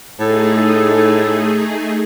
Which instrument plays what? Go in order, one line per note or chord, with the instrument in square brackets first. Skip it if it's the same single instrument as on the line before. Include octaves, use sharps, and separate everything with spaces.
[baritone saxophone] A2 [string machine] A3 D#4 G#4 [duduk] A4